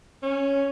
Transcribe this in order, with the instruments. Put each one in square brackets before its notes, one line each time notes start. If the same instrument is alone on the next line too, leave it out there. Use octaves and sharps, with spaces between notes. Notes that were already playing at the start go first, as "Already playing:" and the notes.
[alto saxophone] C#4